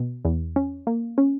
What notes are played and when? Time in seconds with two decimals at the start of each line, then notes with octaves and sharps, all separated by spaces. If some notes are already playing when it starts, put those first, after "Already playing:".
Already playing: B2
0.25 E2
0.56 C#4
0.87 A#3
1.18 C#4